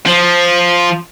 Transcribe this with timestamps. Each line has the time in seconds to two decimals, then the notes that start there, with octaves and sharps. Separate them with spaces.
0.06 F3